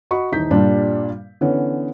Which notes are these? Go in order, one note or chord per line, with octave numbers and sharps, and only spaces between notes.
F#4 D#5 B5 C#6
D#1 E3 D#4 G6 B6
G2 A#2 G3 D4
D3 E3 B3 C#4